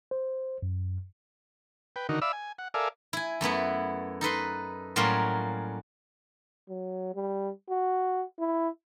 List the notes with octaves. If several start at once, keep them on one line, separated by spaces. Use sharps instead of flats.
C5
F#2
B4 G5
D3 D#3 D#4 F#4 A#4
D5 E5 F5 B5 E6
G#5
F#5
A4 A#4 D5 E5 F5 G#5
E4 G#5
F#2 A3 B3 E4
D#4 A4 B4 C6
A2 F#3 G3 A#3 C#4 F4
F#3
G3
F#4
E4